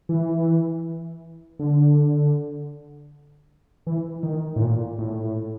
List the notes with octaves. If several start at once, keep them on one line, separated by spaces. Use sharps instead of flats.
E3
D3
E3
D#3
A2
A#2
A2